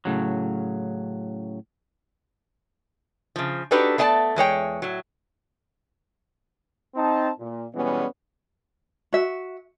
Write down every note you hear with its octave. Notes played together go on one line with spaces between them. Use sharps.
A2 C#3 F#3
C#3 F3
D4 D#4 F#4 G4 A4 B4
A3 B3 D5 G#5 A5
E2 G#3 C#5 G5
A2 F#3
C4 D#4 A5
A#2
B2 E3 G3 G#3 B3 C#4
F#4 E5